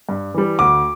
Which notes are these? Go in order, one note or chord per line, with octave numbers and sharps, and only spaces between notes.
G2
E3 G3
D2 D6